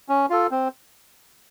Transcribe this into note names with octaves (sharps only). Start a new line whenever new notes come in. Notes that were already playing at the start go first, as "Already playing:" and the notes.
C#4
F4 A4
C4